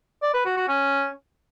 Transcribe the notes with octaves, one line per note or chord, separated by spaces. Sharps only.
D5
B4
F#4
F#4
C#4